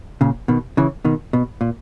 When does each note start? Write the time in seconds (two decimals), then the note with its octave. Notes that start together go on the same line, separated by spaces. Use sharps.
0.21 A#2 C#3
0.48 B2 D#3
0.77 C#3 E3
1.05 B2 D#3
1.33 B2
1.61 A#2